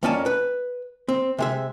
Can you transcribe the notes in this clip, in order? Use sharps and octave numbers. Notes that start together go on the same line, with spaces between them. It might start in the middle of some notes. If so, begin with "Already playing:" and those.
F2 A#3 C#4 D5 G#5 A5
B4
C4
C3 G#3 E5